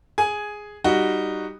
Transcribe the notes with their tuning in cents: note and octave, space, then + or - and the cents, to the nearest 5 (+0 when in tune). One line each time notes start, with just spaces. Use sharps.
G#4 +0 G#5 +5
G3 +0 D#4 -10 F#4 +0